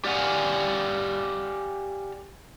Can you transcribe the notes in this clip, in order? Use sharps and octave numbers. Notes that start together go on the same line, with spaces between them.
G4 D5 F5 F#5 G#5